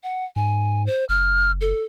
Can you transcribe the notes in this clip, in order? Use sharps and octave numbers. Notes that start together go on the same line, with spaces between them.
F#5
G#2 G#5
C5
F#1 F6
A4